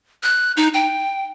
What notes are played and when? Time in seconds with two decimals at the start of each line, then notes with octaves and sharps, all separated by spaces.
0.23 F#6
0.57 D#4
0.74 G5